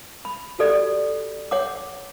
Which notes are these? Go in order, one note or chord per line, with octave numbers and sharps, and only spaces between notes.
B5
F#4 G4 A4 D5
C#5 F#5 D6